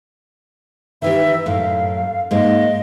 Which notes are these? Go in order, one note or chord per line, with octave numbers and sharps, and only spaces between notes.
D#3 E3 G4 E5
F#2 A2 F5
G#2 G#3 A#3 D#5